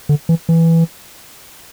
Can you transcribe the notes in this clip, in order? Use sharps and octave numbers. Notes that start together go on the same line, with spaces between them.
D3
E3
E3